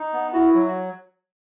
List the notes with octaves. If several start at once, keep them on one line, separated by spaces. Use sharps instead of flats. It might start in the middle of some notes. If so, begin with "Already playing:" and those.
Already playing: D#4
B3
E4 F#4
F#3